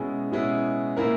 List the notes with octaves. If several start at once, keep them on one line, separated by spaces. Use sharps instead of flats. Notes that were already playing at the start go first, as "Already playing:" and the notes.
Already playing: B2 G#3 C#4 E4 G#4
B2 G#3 C#4 E4 G#4
A#2 A#3 E4 A#4